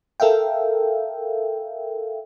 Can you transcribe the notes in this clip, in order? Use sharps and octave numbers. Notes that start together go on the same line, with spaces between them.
A4 A#4 E5 F5 G5